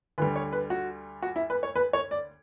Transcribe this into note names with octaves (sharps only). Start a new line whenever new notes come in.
D2 D3 G3 B4
C#5
B4
F#4
F#4
E4
B4
C#5
B4
C#5
D5